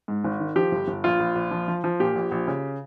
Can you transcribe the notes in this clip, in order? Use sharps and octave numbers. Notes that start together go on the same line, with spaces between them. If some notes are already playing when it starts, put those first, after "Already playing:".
G#2
G#1
D#3
F3 G4
G1
G1
A#1 F4
A#1
A#1
F3
F3
F3
A#2 G4
A#1
A#1
C#3